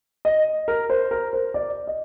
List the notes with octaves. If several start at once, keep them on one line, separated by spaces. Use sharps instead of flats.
D#5
A#4
C5
A#4
C5
D5
D#5